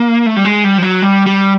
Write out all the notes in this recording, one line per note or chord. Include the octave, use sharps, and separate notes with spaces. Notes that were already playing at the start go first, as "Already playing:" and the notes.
Already playing: A#3
A3
G3
G#3
G3
F3
F#3
G3
G3